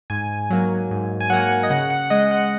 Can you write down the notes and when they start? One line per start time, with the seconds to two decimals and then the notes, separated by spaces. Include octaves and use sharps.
0.10 G#2 G#5
0.50 F#3 A#3
0.91 G#2
1.20 G#5
1.30 F#3 A#3 F#5
1.63 D#5
1.70 C#3 F#5
1.90 F#5
2.10 G#3 D#5
2.31 F#5